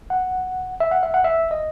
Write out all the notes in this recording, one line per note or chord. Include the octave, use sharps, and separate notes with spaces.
F#5
E5
F#5
E5
F#5
E5
D#5